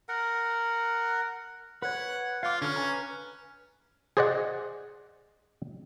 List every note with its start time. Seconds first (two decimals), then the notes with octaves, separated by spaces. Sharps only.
0.09 A#4 F#5
1.82 B4 C#5 F#5
2.43 F4 F5 D6
2.62 D3 C#4 F6
2.76 B4 G#5 A#5
4.17 G#4 C5 D5 D#5 F#5